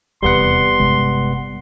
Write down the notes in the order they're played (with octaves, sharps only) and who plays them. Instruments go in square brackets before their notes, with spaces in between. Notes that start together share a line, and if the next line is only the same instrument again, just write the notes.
[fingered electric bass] D#1 E2 C3 [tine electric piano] G3 B3 F#5 [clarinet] C6
[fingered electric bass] G1 C3 G#3